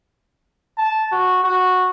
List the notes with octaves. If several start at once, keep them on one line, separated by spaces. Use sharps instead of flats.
A5
F#4
F#4